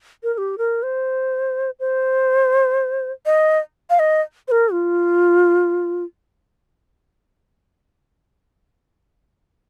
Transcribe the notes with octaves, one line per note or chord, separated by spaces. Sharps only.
A#4
A#4
G4
A#4
C5
C5
D#5
F5
D#5
C5
A#4
F4